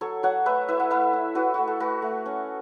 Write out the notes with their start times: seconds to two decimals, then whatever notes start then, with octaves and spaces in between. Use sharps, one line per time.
0.01 F#3 A4 C#5
0.23 F#3 C#5 F#5
0.46 A3 B4 E5
0.68 E4 B4 E5
0.80 F#5
0.90 A3 B4 E5
1.13 E4
1.35 E4 F#4 B4
1.54 A3 F#4
1.67 A4
1.80 A3 F#4 B4
2.02 A3
2.26 C#4